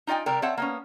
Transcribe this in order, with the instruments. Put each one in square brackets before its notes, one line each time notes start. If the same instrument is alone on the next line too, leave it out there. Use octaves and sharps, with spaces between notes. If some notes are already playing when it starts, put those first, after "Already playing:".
[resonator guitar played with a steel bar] D#4 F4 D#5 G5 G#5
C3 G3 G4 A#4
C4 C#5 E5 F#5 A5
A#3 B3 C#4